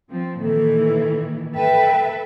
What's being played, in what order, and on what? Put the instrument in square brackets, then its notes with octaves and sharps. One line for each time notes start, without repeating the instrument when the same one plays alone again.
[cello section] F3 C4
[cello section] A#2 D#3 E3 [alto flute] A4
[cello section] A4 B4 E5 [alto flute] G5